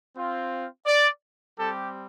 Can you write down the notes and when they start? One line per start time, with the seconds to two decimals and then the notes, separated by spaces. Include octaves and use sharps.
0.16 C4 F4
0.86 D5
1.58 G3 C4 G4 A4